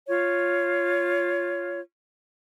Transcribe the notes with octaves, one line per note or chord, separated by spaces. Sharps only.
F4 C#5